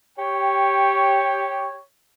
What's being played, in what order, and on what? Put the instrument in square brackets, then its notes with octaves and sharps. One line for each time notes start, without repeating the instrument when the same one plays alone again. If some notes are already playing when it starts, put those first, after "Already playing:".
[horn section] G4 C#5 G5